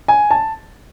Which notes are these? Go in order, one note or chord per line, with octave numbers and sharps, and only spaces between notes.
G#5
A5